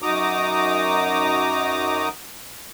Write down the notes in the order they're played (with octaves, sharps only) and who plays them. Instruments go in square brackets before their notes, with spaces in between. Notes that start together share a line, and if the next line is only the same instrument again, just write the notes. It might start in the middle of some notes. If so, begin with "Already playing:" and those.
[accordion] F#2 D#4 F#4 A#5 D6 D#6